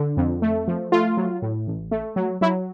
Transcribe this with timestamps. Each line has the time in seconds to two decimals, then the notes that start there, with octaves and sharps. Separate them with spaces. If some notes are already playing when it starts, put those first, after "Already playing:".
Already playing: D3
0.17 F2
0.42 A3
0.68 F3
0.92 A3 F4
1.17 F#3
1.42 A2
1.67 A1
1.91 A3
2.16 F#3
2.41 F#3 E4